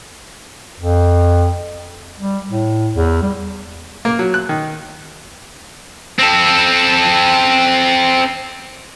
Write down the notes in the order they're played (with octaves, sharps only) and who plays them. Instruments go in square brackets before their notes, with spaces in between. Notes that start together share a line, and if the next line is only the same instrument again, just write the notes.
[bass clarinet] F2
G3
A2
E2
G3
[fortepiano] A#3
F#3
F#6
D#3
[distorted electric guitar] C4 A4